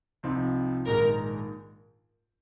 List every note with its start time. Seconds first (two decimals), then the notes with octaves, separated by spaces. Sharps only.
0.23 C2 C3 F3 C4 D#4
0.86 A#1 G#2 D#3 G#3 A#4